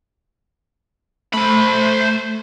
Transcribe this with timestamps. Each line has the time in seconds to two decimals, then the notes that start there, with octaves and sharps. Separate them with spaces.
1.33 A3 C5 B5